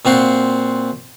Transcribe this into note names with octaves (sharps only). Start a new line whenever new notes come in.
A#2 C4 F#4 F5 C6